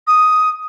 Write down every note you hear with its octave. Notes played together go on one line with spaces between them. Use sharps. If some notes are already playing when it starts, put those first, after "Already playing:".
D#6